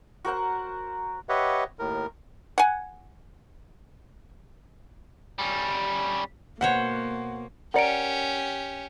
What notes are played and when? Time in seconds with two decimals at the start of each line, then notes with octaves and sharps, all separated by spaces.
0.25 F#4 A#4 C5 F#5
1.29 G4 B4 C#5 D#5 E5 F#5
1.79 D#2 A2 A#4
2.58 F#5 G#5
5.39 G3 C#4
6.61 B2 A#3 C5 C#5 F#5
7.74 C#4 G4 A#4 D5 F#5 A#5 C#7 D7